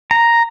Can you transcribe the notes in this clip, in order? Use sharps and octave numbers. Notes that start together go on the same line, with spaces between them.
A#5